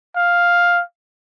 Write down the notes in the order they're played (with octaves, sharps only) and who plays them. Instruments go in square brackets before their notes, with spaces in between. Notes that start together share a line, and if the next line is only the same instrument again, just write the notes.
[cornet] F5